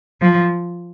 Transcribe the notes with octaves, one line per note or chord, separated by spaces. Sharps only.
F3